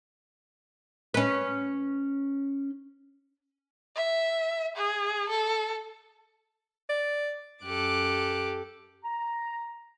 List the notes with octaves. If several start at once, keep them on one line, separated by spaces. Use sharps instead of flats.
C#4 B4
E5
G#4
A4
D5
F#2 G4 A4 D6 F#6
A#5